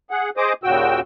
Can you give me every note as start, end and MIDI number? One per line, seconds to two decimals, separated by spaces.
0.11 0.30 68
0.11 0.30 78
0.37 0.53 68
0.37 0.53 72
0.37 0.53 75
0.37 0.53 86
0.37 0.53 87
0.64 1.00 39
0.64 1.00 46
0.64 1.00 49
0.64 1.00 66
0.64 1.00 79
0.64 1.00 88